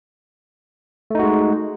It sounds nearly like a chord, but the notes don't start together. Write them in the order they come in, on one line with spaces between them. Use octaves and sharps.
A3 D#4 F#4 G#3